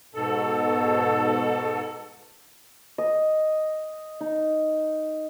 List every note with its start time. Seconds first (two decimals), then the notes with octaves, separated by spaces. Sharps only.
0.15 G#2 B2 A4
2.98 D#5
4.21 D#4